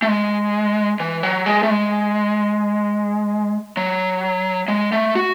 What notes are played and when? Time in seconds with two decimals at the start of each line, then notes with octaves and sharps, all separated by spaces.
0.02 A3
0.08 G#3
1.00 E3
1.23 F#3
1.46 G#3
1.63 A3
1.70 G#3
3.77 F#3
4.68 G#3
4.92 A3
5.15 F#4